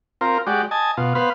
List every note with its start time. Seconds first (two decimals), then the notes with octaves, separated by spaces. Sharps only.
0.21 C4 F4 A#4
0.47 G#3 F#4 G4 D5
0.71 D#5 G#5 A5
0.97 B2 F4
1.15 B3 B4 C5 F5